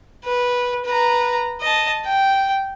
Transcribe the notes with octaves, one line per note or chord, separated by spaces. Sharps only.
B4
B4 A#5
D#5 A5
G5